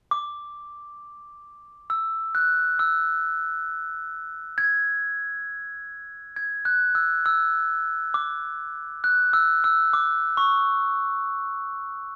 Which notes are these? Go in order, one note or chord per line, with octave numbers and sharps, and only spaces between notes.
D6
E6
F#6
E6
G#6
G#6
F#6
E6
E6
D6
F#6
E6
E6
D6
C#6